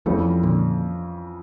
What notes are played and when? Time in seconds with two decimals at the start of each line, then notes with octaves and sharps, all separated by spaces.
0.06 F2 E3 F3 G3 A3 C#4
0.43 A#2 D3